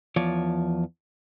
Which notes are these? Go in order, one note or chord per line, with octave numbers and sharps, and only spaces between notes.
E2 F3 C#5 D5